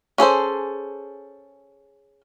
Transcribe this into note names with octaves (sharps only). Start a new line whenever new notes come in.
C#4 G#4 A4 C5